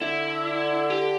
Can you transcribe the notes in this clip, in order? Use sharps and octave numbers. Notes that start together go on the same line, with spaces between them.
D3 E4
G4